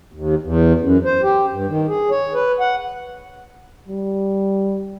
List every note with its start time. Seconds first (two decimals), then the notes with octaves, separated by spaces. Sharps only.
0.13 D#2
0.42 E2
0.81 F#2
1.05 C5
1.23 G4
1.51 G2
1.68 D#3
1.88 G#4
2.10 C#5
2.34 B4
2.60 F#5
3.88 G3